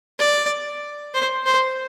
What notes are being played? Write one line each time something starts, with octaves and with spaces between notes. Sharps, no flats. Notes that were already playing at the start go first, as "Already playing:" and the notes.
D5
C5
C5